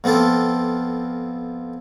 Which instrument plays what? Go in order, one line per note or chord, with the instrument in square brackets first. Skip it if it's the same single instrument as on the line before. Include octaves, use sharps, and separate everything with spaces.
[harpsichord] F2 B3 C4 F4 A4 D6